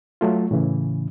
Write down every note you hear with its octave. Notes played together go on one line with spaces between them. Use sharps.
F#3 A3 F4
A2 C#3 E3